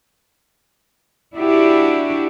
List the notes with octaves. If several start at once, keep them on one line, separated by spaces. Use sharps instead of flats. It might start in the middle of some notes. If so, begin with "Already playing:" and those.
D4 E4 F#4 G4